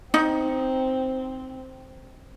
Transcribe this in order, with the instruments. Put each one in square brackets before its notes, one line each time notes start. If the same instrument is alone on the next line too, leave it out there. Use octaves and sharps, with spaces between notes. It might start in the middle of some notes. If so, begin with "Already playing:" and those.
[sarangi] C4 [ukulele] D#4